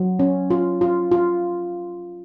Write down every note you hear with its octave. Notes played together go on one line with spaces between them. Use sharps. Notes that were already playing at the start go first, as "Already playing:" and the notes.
Already playing: F#3
C#4
F4
F4
F4